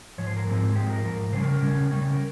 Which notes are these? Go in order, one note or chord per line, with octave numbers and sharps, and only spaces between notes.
G#2 F3 C#5
C5
A#4
G#2 F3 G#3 C4
G#2 F3 G#3 C4 G4
A#4
G#2 F3 A#4
C#3 G3 C#4 C5
A#4
A#4
C#3 G3 C#4
C#3 G3 C#4
A#4